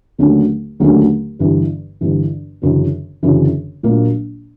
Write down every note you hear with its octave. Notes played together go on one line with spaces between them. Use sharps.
D#2 D3 F#3 A3 C#4
D#2 D3 F#3 A3 C#4
G1 G2 E3
G1 G2 E3
G1 F#2 C#3 E3
G1 F#2 C#3 E3
A#1 A#2 F#3 A#3